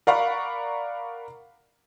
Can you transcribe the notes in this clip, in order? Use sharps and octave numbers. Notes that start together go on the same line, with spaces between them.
A#4 D5 F5 F#5 B5 C#6